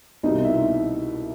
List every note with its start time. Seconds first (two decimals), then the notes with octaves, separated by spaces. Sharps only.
0.23 C2 B2 G3 D#4 D#5
0.45 E4 E5